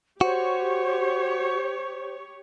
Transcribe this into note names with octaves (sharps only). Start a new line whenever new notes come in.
F#4 G4 C5 C#5